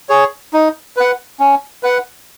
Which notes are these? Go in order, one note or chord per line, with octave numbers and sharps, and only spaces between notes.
G#4 C#5
D#4
B4 F#5
C#4
B4 F#5